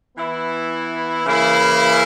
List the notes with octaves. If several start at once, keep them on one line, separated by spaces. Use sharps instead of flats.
E3 B3 E4
C#3 E3 A#3 E4